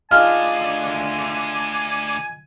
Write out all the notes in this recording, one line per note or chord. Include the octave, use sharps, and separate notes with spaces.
D2 D4 D#4 F4 G#4 G#5 F6